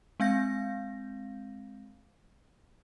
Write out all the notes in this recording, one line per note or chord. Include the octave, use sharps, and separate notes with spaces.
G#3 C4 F5 G6 A#6